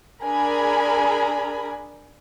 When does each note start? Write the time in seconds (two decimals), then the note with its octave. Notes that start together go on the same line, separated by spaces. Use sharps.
0.24 D4 G#4 A#4 G#5 B5